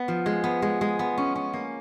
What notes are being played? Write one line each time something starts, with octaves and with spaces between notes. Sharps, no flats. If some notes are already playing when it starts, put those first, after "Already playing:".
Already playing: B3
F3
G#3
B3
G#3
G#3
B3
C#4
C#4
A#3